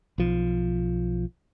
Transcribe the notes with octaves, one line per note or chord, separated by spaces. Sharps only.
B1 F3